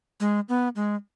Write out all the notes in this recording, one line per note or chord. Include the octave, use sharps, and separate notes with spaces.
G#3
B3
G#3